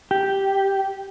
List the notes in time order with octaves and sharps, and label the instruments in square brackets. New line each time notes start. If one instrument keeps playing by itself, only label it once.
[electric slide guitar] G4